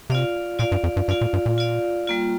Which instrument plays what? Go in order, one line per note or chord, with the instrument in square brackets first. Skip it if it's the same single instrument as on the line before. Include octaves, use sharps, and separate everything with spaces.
[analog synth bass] C3 [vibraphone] F4 D5 F5
[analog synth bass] A#2 [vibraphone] F4 D5 F5
[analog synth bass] G2
F2
G2
[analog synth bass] G2 [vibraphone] F4 D5 F5
[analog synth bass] A#2
G2
A#2
[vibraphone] F4 D5 F5
G3 A#3 F4